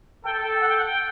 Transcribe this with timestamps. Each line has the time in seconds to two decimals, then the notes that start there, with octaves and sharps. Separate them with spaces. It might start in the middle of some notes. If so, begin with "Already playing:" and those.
0.25 A4 G5
0.42 G5
0.61 F#5
0.69 G5
0.78 F#5
0.86 G5